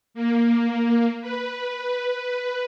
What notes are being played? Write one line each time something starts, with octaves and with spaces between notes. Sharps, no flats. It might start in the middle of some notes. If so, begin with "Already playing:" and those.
A#3
B4